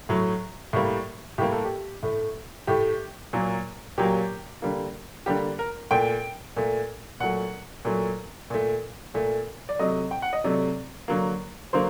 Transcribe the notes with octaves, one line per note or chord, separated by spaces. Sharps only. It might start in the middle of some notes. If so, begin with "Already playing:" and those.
A2 F#3 A3
A2 G3 A#3
A2 G3 A#3 G4
A4
G4
A2 A3
A2 A3 G4
A#2 F#3 A#3
A#2 F#3 A#3 G4
D3 G3 A#3
D3 G3 A#3 G4
A#4
A#2 A3 G5
A#2 A3
A#2 F#3 A3 F#5
A#2 F#3 A3
A#2 A3
A#2 A3
D5
C3 F#3 A3 D#5
G5
F#5
D#5
C3 F#3 A3 D5
D3 F#3 A#3
D3 F#3 A#3 C5